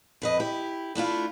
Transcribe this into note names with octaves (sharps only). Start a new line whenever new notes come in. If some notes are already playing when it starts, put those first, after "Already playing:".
F2 B4 D#5
E4 G4
A3 D4 E4 F4